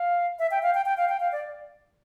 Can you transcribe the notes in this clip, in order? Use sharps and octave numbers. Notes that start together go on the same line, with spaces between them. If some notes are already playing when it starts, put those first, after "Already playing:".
Already playing: F5
E5
G5
F5
G5
G5
F5
G5
F5
D5